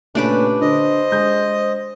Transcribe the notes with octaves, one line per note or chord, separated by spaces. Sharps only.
A#2 C#3 A3 C#4 D4 G4 B4
D3 C5 D#5
G#3 G6